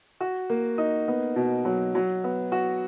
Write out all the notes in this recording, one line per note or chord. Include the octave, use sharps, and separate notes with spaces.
F#4
A#3
D#4
B3
B2
F#3
F#3
B3
F#4